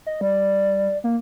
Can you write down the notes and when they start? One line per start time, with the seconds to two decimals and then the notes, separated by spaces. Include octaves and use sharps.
0.06 D#5
0.21 G3 D5
1.04 A#3